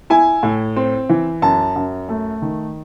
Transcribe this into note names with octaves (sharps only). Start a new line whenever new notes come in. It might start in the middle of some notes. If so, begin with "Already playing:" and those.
E4 G#5
A2
C4
E3
F#2 A5
F#2
A3
D#3